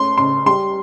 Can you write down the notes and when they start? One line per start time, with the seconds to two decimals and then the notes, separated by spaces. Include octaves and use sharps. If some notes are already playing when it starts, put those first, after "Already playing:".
Already playing: A3 C#4 C6
0.18 C#3 C6
0.46 G3 C6